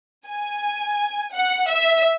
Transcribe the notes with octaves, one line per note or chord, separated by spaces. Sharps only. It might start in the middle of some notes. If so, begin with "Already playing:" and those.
G#5
F#5
E5